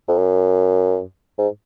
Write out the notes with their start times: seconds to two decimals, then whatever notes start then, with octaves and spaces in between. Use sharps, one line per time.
0.08 F2
0.18 F#2
1.38 G#2